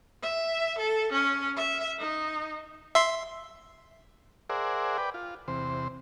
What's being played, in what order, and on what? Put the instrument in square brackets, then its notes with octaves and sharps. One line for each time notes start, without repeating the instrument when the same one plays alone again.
[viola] E5
A4
C#4
E5
D#4
[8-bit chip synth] E5 C6
[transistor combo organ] G#4 A#4 C5 D5 E5 F#5
B4 D5 G5
F4
E2 C3 C5